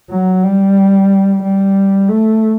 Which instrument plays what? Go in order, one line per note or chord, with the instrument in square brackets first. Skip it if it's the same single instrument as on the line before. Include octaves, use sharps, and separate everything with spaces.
[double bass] F#3
G3
G3
A3